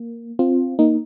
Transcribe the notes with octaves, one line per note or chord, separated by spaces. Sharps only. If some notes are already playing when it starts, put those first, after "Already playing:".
Already playing: A#3
C4 F4
A#3 D#4